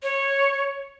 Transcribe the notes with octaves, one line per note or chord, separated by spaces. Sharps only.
C#5